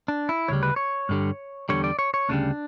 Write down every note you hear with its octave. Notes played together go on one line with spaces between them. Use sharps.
D4
E4
D2 C#3 G3 C#5
B4
C#5
G2 D3 G3
E2 D3 G3 C#5
D5
C#5
C#5
D2 C#3 G3 D4